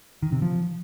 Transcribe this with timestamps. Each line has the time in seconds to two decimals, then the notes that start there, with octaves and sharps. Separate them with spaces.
0.23 D#3
0.32 C3
0.42 F3